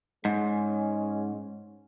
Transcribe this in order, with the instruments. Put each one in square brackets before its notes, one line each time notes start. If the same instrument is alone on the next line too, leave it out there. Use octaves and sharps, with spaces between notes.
[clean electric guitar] G#2 [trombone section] G#3 C#4